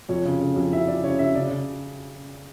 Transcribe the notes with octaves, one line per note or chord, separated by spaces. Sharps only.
F2 C#5
C#3
C#3
F2
E3 E5
E3 D5
C#3 C#5
C#3 E5
C#3 D5
C#3